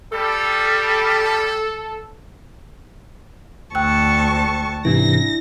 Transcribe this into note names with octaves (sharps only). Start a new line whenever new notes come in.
G3 A4
D2 G5 A5 C#6 E6 F#6
G#2 C3 E3 D4 E4 A#6